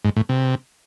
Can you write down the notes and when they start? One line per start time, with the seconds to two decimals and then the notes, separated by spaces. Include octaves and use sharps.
0.05 G#2
0.16 A2
0.29 C3